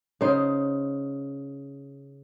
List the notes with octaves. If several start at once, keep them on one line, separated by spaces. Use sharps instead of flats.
C#3 D#4 C5